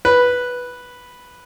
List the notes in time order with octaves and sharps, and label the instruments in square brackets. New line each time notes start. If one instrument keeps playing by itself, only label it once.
[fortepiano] B4